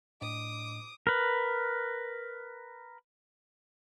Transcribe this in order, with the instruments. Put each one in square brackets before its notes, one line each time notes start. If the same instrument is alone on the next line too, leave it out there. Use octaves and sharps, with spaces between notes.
[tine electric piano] A2 D4 D#5 [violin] D6 D#6
[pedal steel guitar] A#4 B4